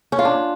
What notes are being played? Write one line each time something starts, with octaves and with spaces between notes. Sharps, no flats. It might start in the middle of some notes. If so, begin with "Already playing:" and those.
C#4
F4
D4